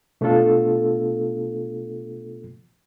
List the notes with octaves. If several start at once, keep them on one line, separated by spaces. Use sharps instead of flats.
B2 A3 B3 D4 F4 A4